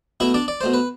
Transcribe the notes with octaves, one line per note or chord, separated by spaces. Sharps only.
B2 A3 E4 E5
D4 D5
D5
B2 A3 C5
B4